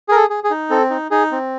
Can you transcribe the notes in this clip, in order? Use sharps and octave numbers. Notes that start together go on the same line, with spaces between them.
G#4 A#4
A4
G#4
G#4
D#4
C4 A4
D#4
D#4 G#4
C4